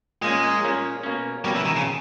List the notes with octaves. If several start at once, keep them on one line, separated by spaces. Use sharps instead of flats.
A#2 G#3 A#3 C#4
A#2 A#3 C#4
B2 A#3 C#4
B2 G3 A#3 C#4
E3
D#3
C#3